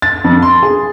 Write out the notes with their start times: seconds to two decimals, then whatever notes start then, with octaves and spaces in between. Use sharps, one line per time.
0.02 A6
0.24 F2
0.42 C6
0.63 G#4